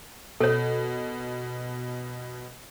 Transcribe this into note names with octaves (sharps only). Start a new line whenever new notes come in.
B2 A4 C#5